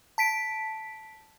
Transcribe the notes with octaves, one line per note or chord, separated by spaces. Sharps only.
A5 B6 D7